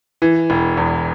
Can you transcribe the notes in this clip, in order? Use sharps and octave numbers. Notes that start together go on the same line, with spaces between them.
E3
E1
E2